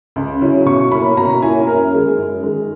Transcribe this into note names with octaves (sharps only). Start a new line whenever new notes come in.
C#2
C#3 F#3 C#4 E4
B2 C#6
A#3 C#4 E4 B5
B2 A#5
A#3 C#4 E4 G#5
F#2 A#4
D#3 G#3
F#2
D#3 G#3